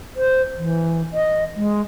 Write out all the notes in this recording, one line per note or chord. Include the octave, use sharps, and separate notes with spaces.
C5
E3
D#5
G#3